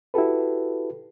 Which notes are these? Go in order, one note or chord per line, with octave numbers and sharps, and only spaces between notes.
E4 F#4 G4 A4 B4